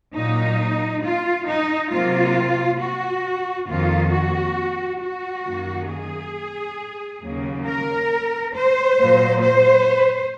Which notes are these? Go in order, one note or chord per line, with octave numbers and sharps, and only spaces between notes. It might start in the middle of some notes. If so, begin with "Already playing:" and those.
A#2 F#3 A#3 D#4
F4
D#4
C3 F#3 A#3 F4
F#4
F2 D#3 A#3 F4
F#4
F#4
F#2 D#3 A#3
G#4
D#2 C#3 F#3 A#3
A#4
C5
A#2 F#3 A#3
C5